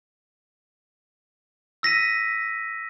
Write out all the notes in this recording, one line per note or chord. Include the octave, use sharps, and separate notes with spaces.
E6 A#6 B6 D#7